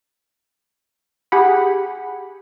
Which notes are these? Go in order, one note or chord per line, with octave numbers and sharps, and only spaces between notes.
G4 G#4 F#5 B5